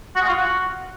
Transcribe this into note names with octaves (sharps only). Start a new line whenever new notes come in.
F#4
G#3
F4
F#4